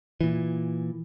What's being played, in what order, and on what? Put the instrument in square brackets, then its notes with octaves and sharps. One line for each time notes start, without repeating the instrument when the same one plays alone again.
[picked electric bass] A#2 E3